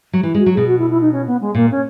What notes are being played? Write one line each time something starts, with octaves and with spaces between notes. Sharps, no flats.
F#3
E3 E4
G#3
F#4
F#3
B2 G#4
F#4
E4
E4
D#4
C#4
B3
G#3
A#2 A#3
C#4